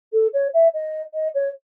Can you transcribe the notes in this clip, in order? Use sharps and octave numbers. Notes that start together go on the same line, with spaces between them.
A4
C#5
E5
D#5
D#5
C#5